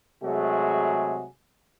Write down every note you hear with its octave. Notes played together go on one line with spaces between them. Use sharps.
C3 F#3 G#3 A3 F#4 G#4